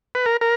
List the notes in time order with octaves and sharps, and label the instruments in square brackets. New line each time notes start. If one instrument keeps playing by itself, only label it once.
[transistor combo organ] B4
A#4
A#4